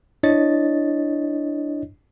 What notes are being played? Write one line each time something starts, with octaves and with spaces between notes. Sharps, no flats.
D4 E4 C#5 D#5 A6